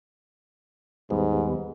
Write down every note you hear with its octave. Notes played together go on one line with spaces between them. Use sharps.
D#2 G#2 G3 B3